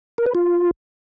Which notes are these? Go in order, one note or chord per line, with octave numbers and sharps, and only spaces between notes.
A#4
B4
F4